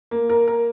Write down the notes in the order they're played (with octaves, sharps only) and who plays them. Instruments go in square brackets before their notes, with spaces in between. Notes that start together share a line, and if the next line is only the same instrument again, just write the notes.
[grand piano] A#3
A#4
A#4